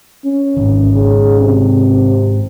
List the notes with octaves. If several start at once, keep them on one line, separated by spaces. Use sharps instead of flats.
C#4
G#2 D#3
C#3
C3